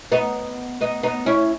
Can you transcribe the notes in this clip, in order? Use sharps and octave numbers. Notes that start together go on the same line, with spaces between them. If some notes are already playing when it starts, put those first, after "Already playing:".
B3 D#4
B3 D#4
B3 D#4
C#4 E4